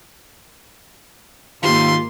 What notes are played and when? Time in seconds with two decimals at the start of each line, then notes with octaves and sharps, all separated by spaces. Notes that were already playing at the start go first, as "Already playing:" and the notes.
1.63 G#2 D#3 A#3 F4 G4 C6